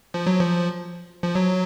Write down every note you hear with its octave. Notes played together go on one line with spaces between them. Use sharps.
F3
F#3
F3
F3
F#3